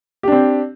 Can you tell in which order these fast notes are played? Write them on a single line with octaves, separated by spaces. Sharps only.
G4 D4 C4